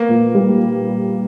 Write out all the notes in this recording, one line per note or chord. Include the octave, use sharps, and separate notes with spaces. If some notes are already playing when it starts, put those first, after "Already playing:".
Already playing: A#3 B3
A#2
G3